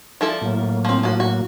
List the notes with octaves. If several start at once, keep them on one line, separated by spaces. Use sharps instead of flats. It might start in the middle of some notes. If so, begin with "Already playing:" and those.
F3 E4 A4 D5
A2 F#3 A#3
F3 C4
F3 F#4
F#4